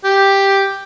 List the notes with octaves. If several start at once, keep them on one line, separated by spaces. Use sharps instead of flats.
G4